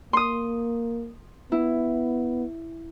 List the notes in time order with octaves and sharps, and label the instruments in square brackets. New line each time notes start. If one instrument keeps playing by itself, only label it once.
[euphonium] A#3 [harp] C6 D#6
[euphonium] B3 [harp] E4